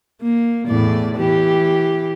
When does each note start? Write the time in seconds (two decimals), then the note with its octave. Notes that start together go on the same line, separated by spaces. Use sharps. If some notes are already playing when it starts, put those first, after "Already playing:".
0.22 A#3
0.68 E2 A2 D5
1.16 E3 G4